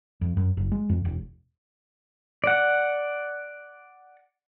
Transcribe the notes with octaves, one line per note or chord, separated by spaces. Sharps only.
F2
F#2
F#1
G#3
F2
E1
D5 F#5